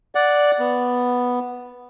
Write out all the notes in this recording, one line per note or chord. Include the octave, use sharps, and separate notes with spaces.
D5 F#5
B3